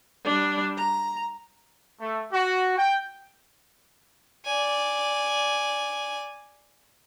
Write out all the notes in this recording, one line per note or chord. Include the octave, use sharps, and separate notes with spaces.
G3 D4
A#5
A3
F#4
G5
D5 G#5